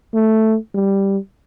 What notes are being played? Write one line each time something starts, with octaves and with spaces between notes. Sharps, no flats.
A3
G3